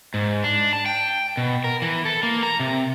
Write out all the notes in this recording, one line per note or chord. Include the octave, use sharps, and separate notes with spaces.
G#2
D4
A5
G5
B2
A#4
E3
A4
A#3
A#5
C3